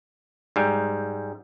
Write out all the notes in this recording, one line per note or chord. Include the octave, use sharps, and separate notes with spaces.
G#2 G3